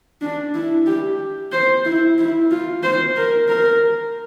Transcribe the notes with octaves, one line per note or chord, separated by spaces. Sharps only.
D4
E4
G4
C5
E4
E4
F4
C5
A#4
A#4